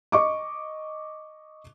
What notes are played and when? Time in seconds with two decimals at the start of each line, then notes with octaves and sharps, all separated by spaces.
0.12 D#5 C#6 D6